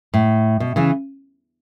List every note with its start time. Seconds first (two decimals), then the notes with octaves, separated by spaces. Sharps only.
0.14 A2
0.60 B2
0.76 C#3 E3